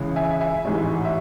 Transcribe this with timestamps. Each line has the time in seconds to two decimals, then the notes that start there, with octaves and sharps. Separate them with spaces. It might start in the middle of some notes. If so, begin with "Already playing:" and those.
Already playing: C#2 C#3 E3
0.16 E5 G#5
0.41 E5 G#5
0.65 A1 G#2 E3
1.05 E5